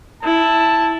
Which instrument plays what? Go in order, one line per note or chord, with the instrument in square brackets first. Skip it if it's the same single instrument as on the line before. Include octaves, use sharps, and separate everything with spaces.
[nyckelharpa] E4 [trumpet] A5